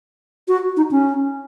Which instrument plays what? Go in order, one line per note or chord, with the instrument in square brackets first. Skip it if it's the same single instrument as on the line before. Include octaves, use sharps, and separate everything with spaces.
[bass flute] F#4
D#4
C#4